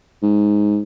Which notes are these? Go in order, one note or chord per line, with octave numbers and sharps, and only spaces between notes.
G#2